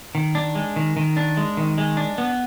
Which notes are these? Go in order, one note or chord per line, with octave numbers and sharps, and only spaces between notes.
D#3
D4
G#3
D#3
D#3
D4
G#3
D#3
G#3
D4
B3